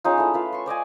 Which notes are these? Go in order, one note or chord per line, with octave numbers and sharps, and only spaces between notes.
G#3 C#4 D#4 F4
A3 E4
F4 B4 F5
C6 C#6
C5 D5 D#5 G#5